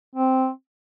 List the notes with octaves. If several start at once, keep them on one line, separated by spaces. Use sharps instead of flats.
C4